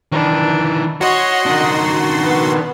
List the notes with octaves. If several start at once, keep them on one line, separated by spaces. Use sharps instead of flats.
D#3 E3 D4
F#4 C#5 D#5 F#5 C6
D#3 D4
B3